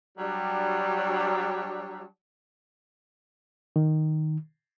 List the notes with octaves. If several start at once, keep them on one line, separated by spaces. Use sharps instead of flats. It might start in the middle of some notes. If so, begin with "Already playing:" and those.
F#3 G3 D4
D#3